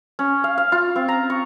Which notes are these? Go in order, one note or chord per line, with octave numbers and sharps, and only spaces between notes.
C#4
F5
F5
F4
C4
A#5
C#6